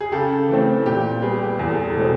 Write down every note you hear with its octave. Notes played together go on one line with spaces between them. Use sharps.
G#4
C#3 G4 A4
E3 A3 C4
A#2 G4
G3 B3 G#4
G4
E2 G#4
A4
G#4
A4
G#4
B2 G#3 C4 A4